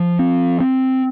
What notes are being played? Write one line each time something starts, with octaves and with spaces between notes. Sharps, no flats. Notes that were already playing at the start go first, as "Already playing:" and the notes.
Already playing: F3
C4
C4